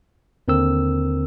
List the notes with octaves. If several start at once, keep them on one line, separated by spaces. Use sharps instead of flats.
D#2 D3 C4 A#4 E6